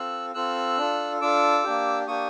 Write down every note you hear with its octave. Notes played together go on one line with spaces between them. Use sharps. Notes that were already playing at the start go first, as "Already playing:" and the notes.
Already playing: C4 F4 A4 E6 F#6
C4 F4 A4 E6 F#6
D4 F4 A4
D4 F4 A4 D6 E6
A#3 D4 G4
A#3 D4 G4 C#6 D#6